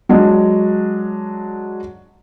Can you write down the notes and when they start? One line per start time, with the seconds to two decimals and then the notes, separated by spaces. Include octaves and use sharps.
0.09 F#3 G#3 D4